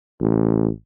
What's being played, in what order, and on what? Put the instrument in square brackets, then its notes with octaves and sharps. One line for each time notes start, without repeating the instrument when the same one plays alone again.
[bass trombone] A1